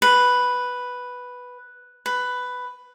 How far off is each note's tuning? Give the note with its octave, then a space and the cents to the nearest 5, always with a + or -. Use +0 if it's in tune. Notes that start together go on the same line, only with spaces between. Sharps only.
B4 +0
B4 +10